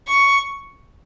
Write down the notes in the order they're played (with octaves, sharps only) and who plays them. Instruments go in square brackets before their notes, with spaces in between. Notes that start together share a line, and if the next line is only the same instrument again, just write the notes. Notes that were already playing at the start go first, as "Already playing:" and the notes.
[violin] C#6